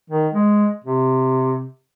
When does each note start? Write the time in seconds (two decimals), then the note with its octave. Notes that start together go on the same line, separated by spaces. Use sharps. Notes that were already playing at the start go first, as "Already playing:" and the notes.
0.10 D#3
0.33 G#3
0.84 C3